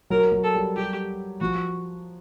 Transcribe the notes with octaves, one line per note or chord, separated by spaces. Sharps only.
F#3 A#4
F#3
A4
G3
G3 G4
F3 F#4